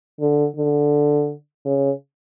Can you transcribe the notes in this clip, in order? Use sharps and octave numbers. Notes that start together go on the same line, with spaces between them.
D3
D3
C#3